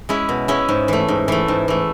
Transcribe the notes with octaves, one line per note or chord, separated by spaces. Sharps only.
G#3 C#4 E4
B2
G#3 C#4 E4
G#2
E3 A3
G#2
E3 A3
G#2
E3 A3